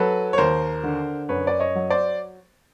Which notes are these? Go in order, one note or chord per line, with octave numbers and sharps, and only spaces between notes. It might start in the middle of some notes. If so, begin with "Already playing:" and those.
Already playing: F#3 A4 B4
C#5
D#2 A#4 C5
D3
F#2 B4 C#5
D5
C#5 D#5
F#3
C5 D5